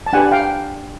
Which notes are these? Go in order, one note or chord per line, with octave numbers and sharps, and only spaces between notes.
A5
D4 G4 B4 F#5 G#5
F5 G5